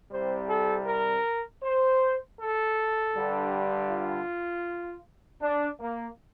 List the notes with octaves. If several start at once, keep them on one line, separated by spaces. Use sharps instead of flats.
C2 C3 G3 C5
A4
A#4
C5
A4
G2 D3 G3
F4
D4
A#3